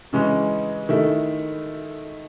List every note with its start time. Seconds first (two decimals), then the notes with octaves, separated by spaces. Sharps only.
0.13 C#3 E3 G#3 C#4
0.89 D#3 A3 E4